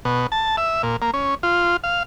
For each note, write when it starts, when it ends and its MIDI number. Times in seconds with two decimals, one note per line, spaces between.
0.05 0.27 47
0.32 0.56 81
0.57 0.82 76
0.83 0.97 46
1.02 1.11 58
1.14 1.35 61
1.43 1.77 65
1.84 2.03 77